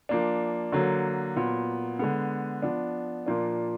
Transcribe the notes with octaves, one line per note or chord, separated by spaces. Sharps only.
F3 A#3 D4
D3 F#3 A#3
A#2 F#3 B3
D3 G#3 B3
F3 B3 D4
A#2 F3 A#3 D4